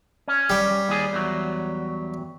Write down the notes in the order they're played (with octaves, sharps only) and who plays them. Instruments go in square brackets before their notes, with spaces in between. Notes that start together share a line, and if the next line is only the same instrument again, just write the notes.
[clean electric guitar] C#4
[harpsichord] G3
[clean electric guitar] D#2 G#4
E2 F#3